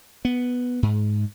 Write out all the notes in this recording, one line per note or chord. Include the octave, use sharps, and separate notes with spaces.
B3
G#2